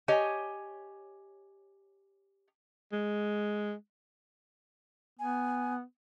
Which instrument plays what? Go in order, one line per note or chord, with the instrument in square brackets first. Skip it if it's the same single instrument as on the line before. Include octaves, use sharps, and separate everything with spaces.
[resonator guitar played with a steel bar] G4 C#5 D#5 G#5
[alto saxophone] G#3
[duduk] B3 [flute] G#5